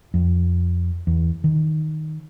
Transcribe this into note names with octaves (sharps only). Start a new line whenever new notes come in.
F2
E2
D#3